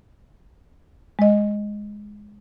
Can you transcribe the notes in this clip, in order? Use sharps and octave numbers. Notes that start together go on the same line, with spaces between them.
G#3 D#5